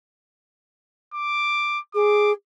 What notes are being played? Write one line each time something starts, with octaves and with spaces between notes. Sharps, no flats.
D6
G#4 D6